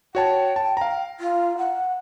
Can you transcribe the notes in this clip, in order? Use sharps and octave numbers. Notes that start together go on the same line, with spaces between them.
F#4 C#5 G5 A5
A5
F5 A#5
F4
F#5